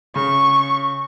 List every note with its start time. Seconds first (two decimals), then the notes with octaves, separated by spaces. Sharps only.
0.16 C#3 C#6